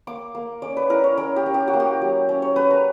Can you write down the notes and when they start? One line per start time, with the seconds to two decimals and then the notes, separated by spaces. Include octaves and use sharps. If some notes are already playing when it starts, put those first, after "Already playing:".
0.07 A#3 D6
0.35 A#3
0.62 C#4 D5
0.77 B4
0.90 E4 A#4
1.04 C#5
1.17 C#4 A#4
1.36 G4
1.46 C#4
1.54 G4
1.68 F#4
1.73 A#3
1.80 G4
2.01 F#3
2.29 C#4
2.42 C#5
2.56 C#4 B4
2.71 A#4